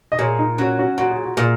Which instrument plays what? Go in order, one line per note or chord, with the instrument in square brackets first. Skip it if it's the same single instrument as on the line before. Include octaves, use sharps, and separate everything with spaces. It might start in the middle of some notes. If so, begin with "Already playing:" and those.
[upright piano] D#5
[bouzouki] A#2 [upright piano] G#4 C#5
[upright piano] D#4
[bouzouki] F#3 [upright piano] C#4 F#4
[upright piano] C#4 F#4
[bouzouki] A#2 [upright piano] F#4
[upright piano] G#4
F#4
[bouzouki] A#2 [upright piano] G#4